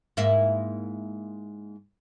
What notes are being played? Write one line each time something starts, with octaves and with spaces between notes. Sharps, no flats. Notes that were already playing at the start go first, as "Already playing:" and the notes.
G#2 A#3 E4